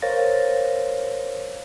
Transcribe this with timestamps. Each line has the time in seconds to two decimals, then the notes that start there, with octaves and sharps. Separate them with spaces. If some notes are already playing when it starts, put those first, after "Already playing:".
0.02 A#4 C5 C#5 F5 A6 A#6